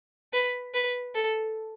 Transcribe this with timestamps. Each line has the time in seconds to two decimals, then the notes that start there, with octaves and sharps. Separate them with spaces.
0.33 B4
0.74 B4
1.14 A4